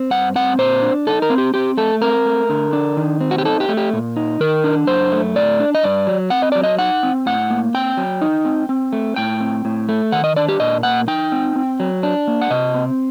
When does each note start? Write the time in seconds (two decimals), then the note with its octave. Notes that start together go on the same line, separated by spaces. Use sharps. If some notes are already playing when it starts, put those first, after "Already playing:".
Already playing: C4
0.11 G2 F#5
0.36 C4 F#5
0.59 A#2 C5
0.82 D4
1.07 D#4 A4
1.22 A#4
1.30 C4
1.38 G4
1.54 C4 G4
1.77 A3 A4
2.01 C4 A#4
2.26 A3
2.49 D3
2.73 D4
2.97 D#3
3.21 C4
3.31 F#4
3.38 G4
3.45 D#4 A4
3.60 G4
3.69 A3
3.77 G4
3.93 A#2
4.16 D#4
4.40 D#3 A#4
4.64 D4
4.87 F#2 C5
5.12 A3
5.36 A2 D5
5.60 D4
5.75 D#5
5.83 G2 D5
6.07 F#3
6.30 C4 F#5
6.42 D#5
6.52 F#3 D5
6.63 D#5
6.79 D#4 F#5
7.03 C4
7.26 A2 F#5
7.50 A#3
7.74 C4 G5
7.97 F#3
8.21 D#4
8.45 C4
8.69 C4
8.93 A3
9.16 A2 G5
9.41 C4
9.65 A2
9.89 A3
10.12 D#3 F#5
10.24 D#5
10.36 D4 D5
10.48 G4
10.60 A#2 D#5
10.83 A#3 F#5
11.08 D#4 G5
11.32 C4
11.56 C4
11.80 F#3
12.03 D4
12.28 A#3
12.42 F#5
12.51 C3 D#5
12.74 C4